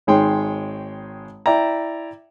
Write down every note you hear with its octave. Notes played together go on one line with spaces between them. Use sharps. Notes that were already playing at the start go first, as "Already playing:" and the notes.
G#1 D#3 G#3 C#5 G5 C6
E4 D5 E5 G5 A#5